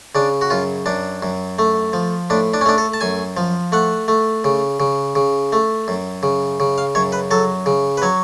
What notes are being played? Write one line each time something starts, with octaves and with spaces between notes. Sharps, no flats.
C#3 D4
F#4
F#2 F4
F#2 D4
F#2
A3
F3
A2 D4
D4
C#4
A3 D4
A4
A5
F#2 G#5
F3
A3 F#5
A3
C#3
C#3
C#3
A3
F#2
C#3
C#3
F5
F#2 C#5
B4
F#3 A4
C#3
B4
F#3 C#5